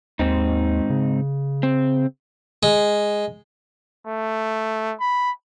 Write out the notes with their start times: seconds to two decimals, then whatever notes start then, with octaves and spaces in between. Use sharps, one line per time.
0.19 D#2 G#2 C4 D#4
0.90 C#3
1.63 C4
2.63 G#3
4.07 A3
5.01 B5